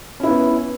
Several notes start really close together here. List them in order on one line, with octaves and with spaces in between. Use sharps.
C#4 E4 B3